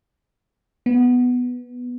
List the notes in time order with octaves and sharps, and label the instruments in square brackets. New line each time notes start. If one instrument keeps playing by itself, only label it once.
[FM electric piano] B3